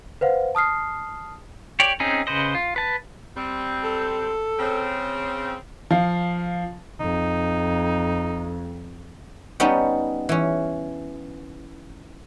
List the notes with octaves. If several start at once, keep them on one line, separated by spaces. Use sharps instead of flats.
B4 C5 F5 F#5
A5 D#6 F6 C7
G4 C#5 D5
C4 C#4 D#4 G#4
C#3 B4 C5 D#5
F4
B4 A5
G3 C4
A4
C#3 C4
F3 F5
F2 D#4
G3 B3 C#4 D#4
E3 C#4